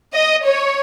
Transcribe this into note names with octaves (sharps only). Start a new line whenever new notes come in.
D#5
C#5